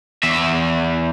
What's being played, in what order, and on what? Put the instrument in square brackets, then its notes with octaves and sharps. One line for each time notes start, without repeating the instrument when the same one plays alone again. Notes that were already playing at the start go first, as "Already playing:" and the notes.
[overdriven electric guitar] E2 E5